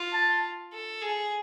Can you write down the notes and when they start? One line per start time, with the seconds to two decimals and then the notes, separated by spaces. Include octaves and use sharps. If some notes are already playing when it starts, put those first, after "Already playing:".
Already playing: F4
0.13 A5
0.72 A4
1.02 G#4